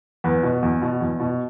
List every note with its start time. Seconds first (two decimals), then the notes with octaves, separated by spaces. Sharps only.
0.24 E2 B4
0.43 B2
0.63 E2
0.82 B2
1.01 E2
1.20 B2